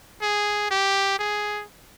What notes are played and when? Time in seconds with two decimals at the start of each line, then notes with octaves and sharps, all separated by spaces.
0.21 G#4
0.71 G4
1.19 G#4